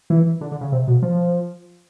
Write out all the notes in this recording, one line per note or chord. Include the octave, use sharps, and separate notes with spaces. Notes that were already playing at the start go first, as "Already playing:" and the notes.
E3
D3
D3
C#3
C3
B2
F3